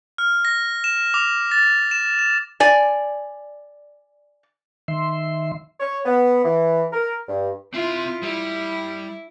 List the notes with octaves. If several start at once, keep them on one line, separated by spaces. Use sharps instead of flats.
F6
A#6
E7
D6
A6
E7
E7
D5 G#5
D#3 E5 C6
C#5
B3
E3
A#4
G2
C4 E4 F4 E5
G3 E4